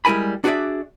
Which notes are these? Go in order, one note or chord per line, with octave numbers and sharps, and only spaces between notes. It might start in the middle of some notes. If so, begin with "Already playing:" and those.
G3 G#3 E4 A#4 G#5 B5
D4 F#4 G#4 B4 D5 E5